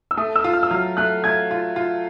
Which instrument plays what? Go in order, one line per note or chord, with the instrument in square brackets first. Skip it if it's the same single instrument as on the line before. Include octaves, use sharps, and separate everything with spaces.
[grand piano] E6
[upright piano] A3 [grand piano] D#6
[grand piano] E6
[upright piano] F4
[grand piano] F6
E6
[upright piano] F#3 [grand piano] F6
[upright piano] A3 [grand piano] F#6
[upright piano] A3 [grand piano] G#6
[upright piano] F4
F4